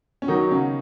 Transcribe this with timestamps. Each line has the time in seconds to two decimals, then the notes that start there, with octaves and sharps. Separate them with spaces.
0.22 C#4
0.28 D#3 F#3 D#4
0.51 C#3 C#4